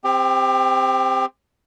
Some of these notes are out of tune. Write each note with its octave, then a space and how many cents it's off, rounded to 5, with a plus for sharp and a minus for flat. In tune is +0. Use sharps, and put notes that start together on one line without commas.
C4 -10 G4 +30